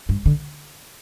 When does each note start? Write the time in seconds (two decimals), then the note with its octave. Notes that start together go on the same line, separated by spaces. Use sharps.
0.09 G2
0.26 D3